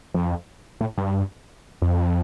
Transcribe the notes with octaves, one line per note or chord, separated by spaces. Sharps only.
F2
A2
G2
F2